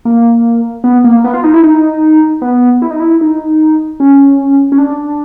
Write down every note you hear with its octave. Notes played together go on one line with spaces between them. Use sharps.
A#3
B3
A#3
B3
F4
D#4
E4
D#4
B3
E4
D#4
E4
D#4
C#4
C#4
D4